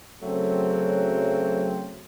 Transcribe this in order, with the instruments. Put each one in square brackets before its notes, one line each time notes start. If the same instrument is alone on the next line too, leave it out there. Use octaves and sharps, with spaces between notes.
[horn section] F#2 C#3 F#3 A3 C4